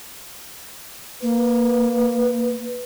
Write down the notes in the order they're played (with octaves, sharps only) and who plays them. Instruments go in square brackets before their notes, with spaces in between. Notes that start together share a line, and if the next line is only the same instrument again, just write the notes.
[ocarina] A#3 [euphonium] B4